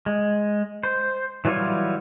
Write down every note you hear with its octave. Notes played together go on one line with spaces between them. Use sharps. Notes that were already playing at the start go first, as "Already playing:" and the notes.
G#3
C5
E3 F#3 G3 F4 C#5